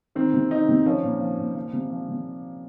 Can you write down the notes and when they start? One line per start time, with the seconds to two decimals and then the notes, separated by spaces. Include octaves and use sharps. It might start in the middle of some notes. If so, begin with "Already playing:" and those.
0.15 D#3 C4
0.34 C3
0.51 D#3 D#4
0.69 C3
0.86 F3 C#4
1.03 A#2
1.21 F3
1.38 A#2
1.56 F3
1.73 C3
1.91 F3
2.09 C3